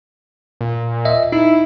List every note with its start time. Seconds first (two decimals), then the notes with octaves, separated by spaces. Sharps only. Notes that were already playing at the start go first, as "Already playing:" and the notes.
0.61 A#2
1.05 D#5 E5
1.32 D#4 E4